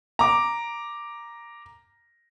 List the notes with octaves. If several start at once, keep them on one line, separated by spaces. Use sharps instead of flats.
A#5 D6